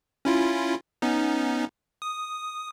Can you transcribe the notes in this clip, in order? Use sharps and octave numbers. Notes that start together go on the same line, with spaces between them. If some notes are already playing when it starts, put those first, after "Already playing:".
C#4 E4 F4
B3 C#4 D#4
D#6